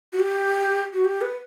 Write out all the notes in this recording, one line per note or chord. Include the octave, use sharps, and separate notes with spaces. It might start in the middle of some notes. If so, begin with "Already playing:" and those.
F#4
G4
F#4
G4
B4